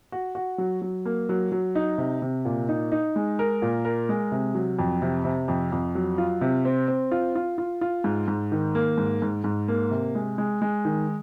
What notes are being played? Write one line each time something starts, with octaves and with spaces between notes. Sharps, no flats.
F#4
F#4
F#3
F#3
A#3
F#3
F#3
D#4
C3
C3
A#2
D#4
D#4
G#3
A#4
A#2
A#4
G#3
C3
F#3
F2
C3
C3
F2
F2
F#3
F4
C3
C4
C4
F4
F4
F4
F4
G#2
G#2
D#3
A#3
G#2
G#2
G#2
A#3
C3
G#3
G#3
G#3
D#3